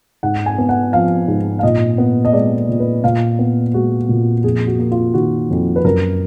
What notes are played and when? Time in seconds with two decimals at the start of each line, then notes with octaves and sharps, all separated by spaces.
0.23 G#2 F#5
0.46 G#5
0.58 B3
0.69 F#5
0.93 F3 F5
1.28 G#2
1.59 F5
1.63 A#2 D#5
1.98 B3
2.25 D#5
2.33 G#3 D5
2.69 A#2
2.80 B4
3.04 A#2 F5
3.39 B3
3.74 G#3 F#4
4.09 A#2
4.44 F2 G#4
4.67 F#4
4.79 A#3
4.92 F4
5.14 D#3 F#4
5.50 F2
5.76 B4
5.84 F#2 A#4